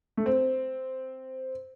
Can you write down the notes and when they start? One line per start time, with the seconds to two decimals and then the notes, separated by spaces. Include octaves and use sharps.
0.17 A3
0.26 C4